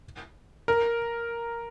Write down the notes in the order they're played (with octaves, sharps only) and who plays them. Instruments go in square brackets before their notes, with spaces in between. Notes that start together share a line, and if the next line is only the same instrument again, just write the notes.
[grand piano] A#4